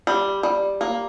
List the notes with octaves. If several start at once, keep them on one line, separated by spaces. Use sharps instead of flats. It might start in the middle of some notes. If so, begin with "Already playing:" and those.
G3
G3
A#3